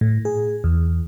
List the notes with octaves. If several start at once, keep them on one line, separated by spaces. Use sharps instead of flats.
A2
G#4
E2